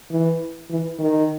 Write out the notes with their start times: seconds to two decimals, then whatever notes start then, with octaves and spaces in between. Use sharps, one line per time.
0.11 E3
0.70 E3
0.99 D#3